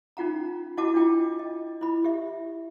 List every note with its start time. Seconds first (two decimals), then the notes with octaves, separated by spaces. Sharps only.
0.17 C#4 D#4 F4 F#5 A#5
0.77 E4 F#4 D#5 F#5 A5 D6
0.94 D4 E4 F4 G5
1.39 D#5
1.81 E4 B5
2.04 G4 E5